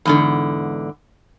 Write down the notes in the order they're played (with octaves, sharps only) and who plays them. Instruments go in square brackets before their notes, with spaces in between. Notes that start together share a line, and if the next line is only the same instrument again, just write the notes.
[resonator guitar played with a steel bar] E2 G#2 D3